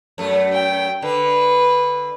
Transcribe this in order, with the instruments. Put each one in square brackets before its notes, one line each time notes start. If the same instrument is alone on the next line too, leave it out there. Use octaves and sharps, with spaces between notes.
[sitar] F#2 A3
[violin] G5
[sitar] D3 [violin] B4